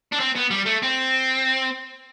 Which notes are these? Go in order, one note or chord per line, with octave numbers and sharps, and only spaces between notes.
D4
C4
B3
G3
A3
C4